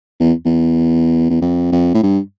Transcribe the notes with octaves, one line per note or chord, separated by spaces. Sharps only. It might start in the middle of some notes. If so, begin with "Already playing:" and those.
E2
E2
E2
F2
F2
A2
G2